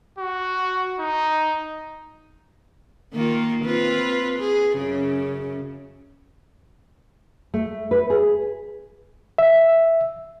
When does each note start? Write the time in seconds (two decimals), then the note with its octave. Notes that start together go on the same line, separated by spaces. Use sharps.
0.19 F#4
1.00 D#4
3.14 D#3 A#3 F4
3.64 C4 F4 B4
4.39 G#4
4.76 F#2 C#3
7.54 A3
7.91 B4
8.10 G#4
9.38 E5